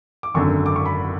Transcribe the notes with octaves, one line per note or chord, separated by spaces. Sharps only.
D6
G#1 F#2 D3 C#6
D6
C#6
B5